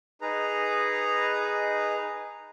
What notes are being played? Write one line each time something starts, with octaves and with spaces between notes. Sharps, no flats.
D#4 G#4 B4 A#5